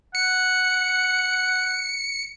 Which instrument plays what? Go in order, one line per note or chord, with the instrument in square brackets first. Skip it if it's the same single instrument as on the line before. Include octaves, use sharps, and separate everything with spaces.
[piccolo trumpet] F#5 [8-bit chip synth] C#7